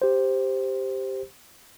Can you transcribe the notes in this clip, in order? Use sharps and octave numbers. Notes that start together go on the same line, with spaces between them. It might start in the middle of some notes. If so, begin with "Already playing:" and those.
G4 C5